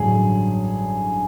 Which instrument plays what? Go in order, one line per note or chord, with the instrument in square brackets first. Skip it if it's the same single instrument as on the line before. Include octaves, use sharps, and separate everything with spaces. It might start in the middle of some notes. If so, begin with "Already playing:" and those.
Already playing: [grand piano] A1 G2 D3 F#3 G#4